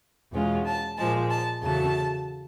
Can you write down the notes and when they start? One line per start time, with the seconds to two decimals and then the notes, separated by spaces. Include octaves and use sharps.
0.33 E2 B2 G#3 C#4 F4
0.66 A5
0.97 A#2 F3 G#3 A5
1.30 A5
1.62 E2 C#3 F#3 A3 A5